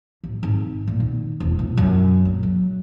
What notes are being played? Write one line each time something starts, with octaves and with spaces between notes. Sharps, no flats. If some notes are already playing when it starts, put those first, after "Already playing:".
A1
G#1
A#2
D#3
E1
A#1
F#2
A#1
F#3